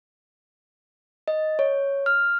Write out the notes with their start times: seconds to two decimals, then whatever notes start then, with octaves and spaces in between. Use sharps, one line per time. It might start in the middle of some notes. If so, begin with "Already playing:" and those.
1.28 D#5
1.59 C#5
2.06 F6